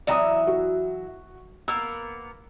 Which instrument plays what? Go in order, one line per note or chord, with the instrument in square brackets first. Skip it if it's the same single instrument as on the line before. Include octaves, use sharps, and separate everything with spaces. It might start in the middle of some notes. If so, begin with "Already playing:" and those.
[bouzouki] E3 F#3 E5 [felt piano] D5 A#5 D#6
[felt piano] F#4
[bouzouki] A#3 B3 A#4 [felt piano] E6